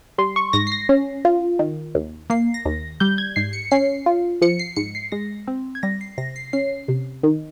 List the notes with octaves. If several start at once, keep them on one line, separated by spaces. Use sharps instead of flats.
G3 C6
C#6
G#2 A#6
C7
A#6
C#4
F4
D#3
D#2
A#3 C7
A#6
D#2
G3 G6
G#6
G#2 C7
C#7
C#4 C7
F4
F3 C#7
C7
G#2 C#7
C7
G#3 A#6
C4
G#6
G3 A#6
C7
C3 A#6
C7
C#4 C7
C3
D#3